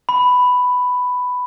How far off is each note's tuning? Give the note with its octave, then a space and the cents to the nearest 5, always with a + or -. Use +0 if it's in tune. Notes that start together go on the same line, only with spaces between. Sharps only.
B5 +10